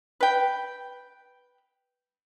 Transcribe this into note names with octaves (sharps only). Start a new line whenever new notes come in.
B4 G5